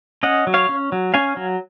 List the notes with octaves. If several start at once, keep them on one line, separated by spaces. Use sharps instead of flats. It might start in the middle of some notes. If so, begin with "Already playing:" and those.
C#4 D#5 F#5
F#3
C#5 F5
C#4
F#3
C#4 F5 G#5
F#3